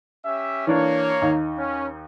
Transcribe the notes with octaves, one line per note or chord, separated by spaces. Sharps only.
C#4 G4 E5
E3 A#3 D4 C#5
D#2 D#4
C#4